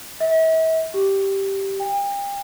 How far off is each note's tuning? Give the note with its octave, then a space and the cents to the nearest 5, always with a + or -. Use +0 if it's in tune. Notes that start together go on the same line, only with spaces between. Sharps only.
E5 -40
G4 -10
G5 +35